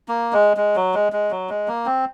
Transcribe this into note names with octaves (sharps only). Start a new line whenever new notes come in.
A#3
G#3
G#3
F#3
G#3
G#3
F#3
G#3
A#3
C4